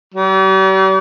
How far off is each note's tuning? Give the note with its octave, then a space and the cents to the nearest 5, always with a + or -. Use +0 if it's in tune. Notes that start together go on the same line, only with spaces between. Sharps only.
G3 -45